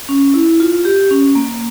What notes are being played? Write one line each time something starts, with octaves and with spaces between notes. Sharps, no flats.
C#4
E4
F4
G4
C#4
A#3